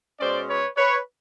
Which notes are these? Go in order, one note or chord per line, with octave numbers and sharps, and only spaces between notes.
B2 G#3 C#4 C5 D5
B4 C#5
B4 C#5